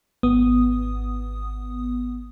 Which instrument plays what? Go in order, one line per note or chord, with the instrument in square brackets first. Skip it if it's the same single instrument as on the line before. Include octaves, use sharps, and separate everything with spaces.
[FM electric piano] G#1 B3 D#6